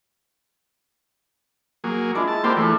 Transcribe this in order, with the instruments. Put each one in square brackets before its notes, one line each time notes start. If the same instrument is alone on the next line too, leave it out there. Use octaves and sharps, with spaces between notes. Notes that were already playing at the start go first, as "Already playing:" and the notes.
[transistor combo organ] F#3 A#3 G#4
[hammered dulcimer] G#3 E4 F4 [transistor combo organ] D4
[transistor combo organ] A5
[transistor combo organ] A#3 G4 C5 [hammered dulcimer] B3 D4 F4
[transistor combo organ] E3 A3 [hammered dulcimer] D4 G#4